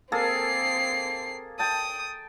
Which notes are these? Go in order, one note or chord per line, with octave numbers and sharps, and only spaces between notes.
A#3 C4 G#4 A4 C7
G5 A5 D#6